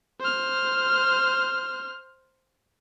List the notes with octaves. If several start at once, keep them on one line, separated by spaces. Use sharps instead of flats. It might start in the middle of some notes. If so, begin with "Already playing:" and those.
C5 F6